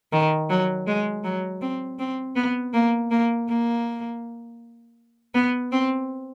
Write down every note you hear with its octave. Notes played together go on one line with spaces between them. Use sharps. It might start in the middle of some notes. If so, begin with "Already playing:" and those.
D#3
F#3
G#3
F#3
C4
C4
B3
A#3
A#3
A#3
B3
C4